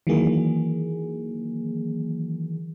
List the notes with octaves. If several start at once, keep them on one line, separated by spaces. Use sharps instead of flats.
D#3 E3 F#3 A#3 G#4